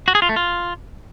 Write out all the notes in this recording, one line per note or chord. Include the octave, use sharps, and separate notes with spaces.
F#4
G#4
F4
A3
F4